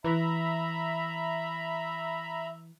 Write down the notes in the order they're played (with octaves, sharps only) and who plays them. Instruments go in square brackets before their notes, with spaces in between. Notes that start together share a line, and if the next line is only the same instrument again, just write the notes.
[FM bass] E3 [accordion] E5 A#5 B5